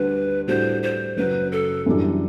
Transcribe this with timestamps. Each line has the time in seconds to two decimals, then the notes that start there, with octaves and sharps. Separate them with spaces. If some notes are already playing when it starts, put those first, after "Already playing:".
Already playing: D2 D3 G3 D4 B4
0.48 A2 G3 D4 F#4 A4 C5
0.83 C5
1.17 F#1 F#2 F#3 B4
1.52 A4
1.86 F#2 E3 G3 D4